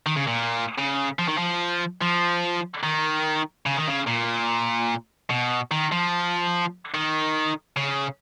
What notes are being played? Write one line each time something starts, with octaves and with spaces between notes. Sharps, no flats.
D#3
C#3
A#2
C#3
F3
D#3
F3
F3
D#3
C#3
D#3
C#3
A#2
B2
D#3
F3
D#3
C#3